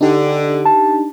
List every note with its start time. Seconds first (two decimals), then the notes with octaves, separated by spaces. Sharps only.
0.01 D3 D4 D#4 G4
0.65 A5